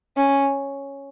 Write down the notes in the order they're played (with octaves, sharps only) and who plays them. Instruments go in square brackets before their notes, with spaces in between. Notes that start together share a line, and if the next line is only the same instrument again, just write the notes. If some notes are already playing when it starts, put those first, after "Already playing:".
[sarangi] C#4